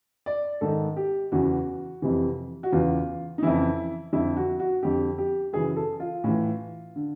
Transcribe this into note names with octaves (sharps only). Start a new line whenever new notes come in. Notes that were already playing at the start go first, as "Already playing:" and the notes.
D5
G#2 D#3 A4
G4
E2 C#3 E3 F#4
F2 C3 E3
F#4
E2 C#3 E3 F4
D#4
F2 C#3 E3 E4
F2 D3 E4
F#4
F#4
F2 D3 G4
G4
F#2 C#3 E3 G#4
A4
F4
A2 E3
D3